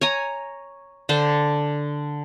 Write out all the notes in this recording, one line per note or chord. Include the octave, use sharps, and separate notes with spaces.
C#5 G#5 A#5
D3 D4 C5